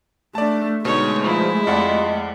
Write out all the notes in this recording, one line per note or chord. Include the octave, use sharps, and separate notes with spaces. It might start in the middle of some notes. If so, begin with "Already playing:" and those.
A3 D4 D5 A5
B2 D3 G#3 A3 D#4 C#5
F3 E4
F2 F4 G4 D5 D#5 F#5